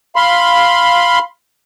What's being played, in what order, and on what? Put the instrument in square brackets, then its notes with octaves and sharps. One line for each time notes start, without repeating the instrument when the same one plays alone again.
[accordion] F5 B5 C6